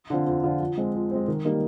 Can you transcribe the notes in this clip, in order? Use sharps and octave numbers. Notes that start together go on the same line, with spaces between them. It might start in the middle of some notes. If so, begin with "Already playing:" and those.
D3 F3 C4 F4
F2
D3 F3 C4 F4
F3
G#3 C4
F3
G#3 C4
D#3
G3 A#3 D#4